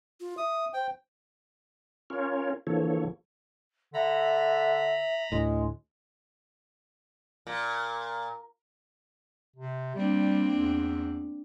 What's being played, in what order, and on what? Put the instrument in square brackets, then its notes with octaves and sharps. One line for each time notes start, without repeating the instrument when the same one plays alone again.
[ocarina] F4
[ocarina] E5 [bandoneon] D#6
[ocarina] C5 [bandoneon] G5
[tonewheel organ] C#4 F4 A#4 C#5
D3 E3 F3 A#3 A4 C#5
[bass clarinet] D3 [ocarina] E5 [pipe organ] A#5 B5
[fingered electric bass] D2 A2 [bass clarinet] G#3
[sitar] A#2
[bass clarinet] C3
[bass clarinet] G3 [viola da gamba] A#3 C4 D4
[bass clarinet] E2